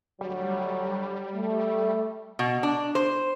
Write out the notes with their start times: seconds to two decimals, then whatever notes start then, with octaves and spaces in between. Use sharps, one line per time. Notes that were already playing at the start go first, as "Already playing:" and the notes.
0.21 D2 F#3 G3
1.35 A3
2.39 B2
2.63 D4
2.95 C5